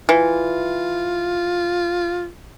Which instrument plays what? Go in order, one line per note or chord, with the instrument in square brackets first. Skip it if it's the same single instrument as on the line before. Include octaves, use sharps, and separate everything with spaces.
[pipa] E3 [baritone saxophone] F4